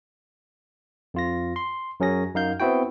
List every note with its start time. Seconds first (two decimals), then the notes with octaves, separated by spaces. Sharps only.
1.14 F2 F4 A#6
1.56 C6
2.00 F#2 F#3 C#4 G#4 A#6
2.34 F#2 D#4 F5 G6
2.60 B3 C4 E4 F#4 G5